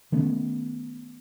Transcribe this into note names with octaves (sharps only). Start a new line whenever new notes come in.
D#3 A3 B3 C#4